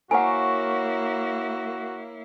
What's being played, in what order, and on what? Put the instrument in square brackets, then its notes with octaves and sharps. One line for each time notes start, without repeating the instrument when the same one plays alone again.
[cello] A#3 E4 [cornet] F#4 [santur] A#4 C#5 F5 [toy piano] F#5 G#5